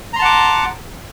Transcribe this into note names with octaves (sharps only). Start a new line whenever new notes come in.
F#5 A5 A#5 C6 D6